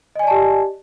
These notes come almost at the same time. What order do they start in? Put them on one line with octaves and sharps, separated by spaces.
D#5 G#5 D5 A5 G4